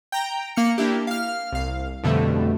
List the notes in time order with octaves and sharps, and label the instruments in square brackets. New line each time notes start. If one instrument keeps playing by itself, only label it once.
[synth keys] G5 A#5
A#3 F6 C#7
A#3 D4 E4 G4
F5 F6
C2 F5
F2 B2 D3 G3 A3